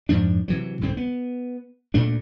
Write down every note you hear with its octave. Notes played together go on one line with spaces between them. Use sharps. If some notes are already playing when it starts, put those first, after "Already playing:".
F2 G#2 F3 D4
C3 E3 F#3
C2 G#2 D3 C4
B3
D2 A#2 A3 D4